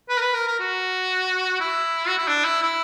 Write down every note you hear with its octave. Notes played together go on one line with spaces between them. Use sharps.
B4
A#4
B4
A#4
A#4
F#4
E4
F#4
E4
D4
E4
E4